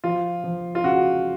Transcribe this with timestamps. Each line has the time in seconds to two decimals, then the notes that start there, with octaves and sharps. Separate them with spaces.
0.04 F3 F4
0.44 F3
0.75 F4
0.84 C#3 F#4